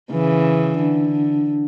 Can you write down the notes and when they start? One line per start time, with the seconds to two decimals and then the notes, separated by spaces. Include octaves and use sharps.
0.12 C#3 E3
0.78 D3